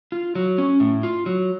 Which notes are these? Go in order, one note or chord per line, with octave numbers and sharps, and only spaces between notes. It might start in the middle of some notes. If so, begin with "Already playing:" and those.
F4
F#3
C#4
A2
F4
F#3